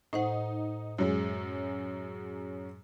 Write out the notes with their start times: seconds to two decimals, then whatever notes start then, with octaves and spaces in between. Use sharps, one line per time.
0.13 A2 D#4 C5 F#5
0.98 F#2 F#3 G#3